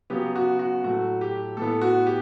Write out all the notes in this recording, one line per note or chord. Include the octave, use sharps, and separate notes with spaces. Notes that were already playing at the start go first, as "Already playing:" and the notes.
C#3 F#3 B3 G4
F#4
F#4
A2 F#3 A3 F#4
G4
A2 E3 B3 A4
F#4
G4